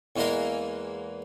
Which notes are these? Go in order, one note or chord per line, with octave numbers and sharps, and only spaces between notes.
E2 E3 G#3 A#3 A#4 F5